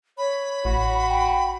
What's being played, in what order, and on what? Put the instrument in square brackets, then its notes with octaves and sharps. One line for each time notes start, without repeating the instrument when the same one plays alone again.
[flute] C#5 [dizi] B5
[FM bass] A1 [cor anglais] F#4
[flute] G5